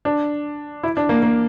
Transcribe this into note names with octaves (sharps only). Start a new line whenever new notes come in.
D4
E4
D4
A#3
A#3